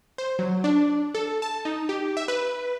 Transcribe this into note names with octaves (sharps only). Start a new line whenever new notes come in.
C5
F#3
D4
A4
A5
D#4
G4
E5
B4